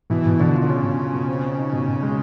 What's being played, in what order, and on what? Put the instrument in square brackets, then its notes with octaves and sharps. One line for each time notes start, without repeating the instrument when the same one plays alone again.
[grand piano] B2 [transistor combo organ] E3
[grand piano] B2
[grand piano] B2 [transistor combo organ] D3
[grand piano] F4
[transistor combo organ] D3
[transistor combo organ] C#3 [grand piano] C#4
[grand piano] B2
F4
B2
C4
C4
D#4
B2
B2
G#3